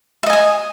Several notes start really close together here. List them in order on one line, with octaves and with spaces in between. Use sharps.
E5 D#5 G#5 D#6